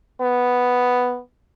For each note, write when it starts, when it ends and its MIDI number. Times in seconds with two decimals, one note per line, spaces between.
0.21 1.20 59